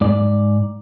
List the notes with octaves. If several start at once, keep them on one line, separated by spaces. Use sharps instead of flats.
G#2 D5